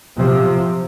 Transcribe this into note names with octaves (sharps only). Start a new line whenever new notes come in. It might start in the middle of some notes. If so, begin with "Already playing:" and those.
C3 F3